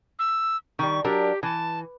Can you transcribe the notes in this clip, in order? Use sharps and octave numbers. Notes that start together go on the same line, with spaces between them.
E6
D#3 G3 C#6
F#3 D4 G4 A#4
E3 A5